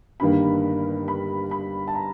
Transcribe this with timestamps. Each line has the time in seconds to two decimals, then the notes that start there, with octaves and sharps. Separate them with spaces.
0.20 G1 G2 D#3 G3 A#3 B5
1.08 B5
1.51 B5
1.88 A5
1.95 A#5